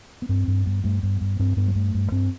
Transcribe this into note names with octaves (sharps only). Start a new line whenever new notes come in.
B3
G2 C4
G2
G2 B3
G2 A3
G2 B3
G2
G2 C4
G2 B3
G3
G2 A3
G2
G2 C4